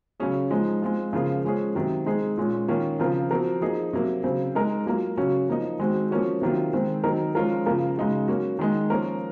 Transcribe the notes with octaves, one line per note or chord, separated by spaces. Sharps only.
C#3 F#3 C#4 G#4
F3 G#3 D#4
G#3 C4 F4
C#3 F3 A#3 F4 G#4
F3 G#3 C#4 G#4
C3 D#3 F#3
G#3 C4 D#4 G#4
A#2 G#3 C#4
D#3 A#3 C#4 F4
C#3 F3 C4 F4 A#4
F3 C4 F#4 A#4
F3 A#3 D#4 G#4
C3 F#3 A#3
C#3 F#3 C4
G#3 D#4 A#4
F#3 A#3 F4 A#4
C#3 F#3 C#4 F#4
F3 A#3 D#4
D#3 G#3 C4 F#4
F3 A#3 C#4 F#4
C3 D#3 F#3 A#3 F4
D#3 G#3 C4
D#3 F#3 C4 D#4 A#4
F3 G#3 C#4 F4 A#4
C#3 F3 A#3 F4 A#4
C#3 G#3 D#4 F#4
F#3 A#3 C#4 F#4
D#3 G#3 D#4
F3 A#3 C#4 F4 A#4